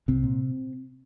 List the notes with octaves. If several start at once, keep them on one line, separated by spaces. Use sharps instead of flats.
C2 C3 C4
A#2